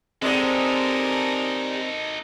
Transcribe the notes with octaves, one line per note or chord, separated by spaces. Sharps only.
G3 G#3 C4 D#4 A4 A#4